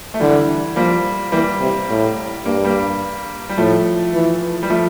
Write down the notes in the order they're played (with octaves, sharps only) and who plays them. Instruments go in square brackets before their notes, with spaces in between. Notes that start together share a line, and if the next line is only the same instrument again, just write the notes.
[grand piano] A3
[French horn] D3 [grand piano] E3 G3
[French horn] F3 [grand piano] G3 A#3
[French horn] E3 [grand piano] G3 A#3
[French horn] C3
A2
[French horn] G2 [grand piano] A#3
[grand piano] G3 A#3
G3
[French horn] A2 [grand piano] F3 A3
[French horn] E3
[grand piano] G3
F3 A3